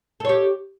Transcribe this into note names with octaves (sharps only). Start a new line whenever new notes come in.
G4 A4 C#5